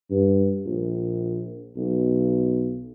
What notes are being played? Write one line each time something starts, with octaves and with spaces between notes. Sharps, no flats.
G2
A#1
B1